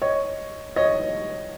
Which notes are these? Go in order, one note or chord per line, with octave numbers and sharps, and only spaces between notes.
C#5 D#5
C#5 D#5